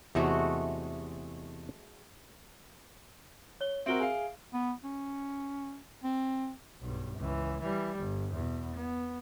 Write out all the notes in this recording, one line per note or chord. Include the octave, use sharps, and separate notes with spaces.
E2 C3 G#3 A3 F#4
C#5 G7
C4 F#4 A#4 E5 D7 G7
G#4 F5
B3
C#4
C4
B1 G2
C#2 E3
E3 G3
G1
E2 B2
B3